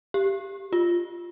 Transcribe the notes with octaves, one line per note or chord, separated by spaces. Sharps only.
G4
F4